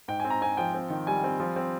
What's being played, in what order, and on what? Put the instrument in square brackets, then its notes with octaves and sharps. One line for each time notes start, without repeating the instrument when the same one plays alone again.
[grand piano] G#2 G5
G#5
C4
A#5
C4 G#5
F3 G5
C4
D#3
G3 G#5
C4
F3
C4